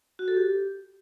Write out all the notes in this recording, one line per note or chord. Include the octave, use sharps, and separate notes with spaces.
F#4
A4
G4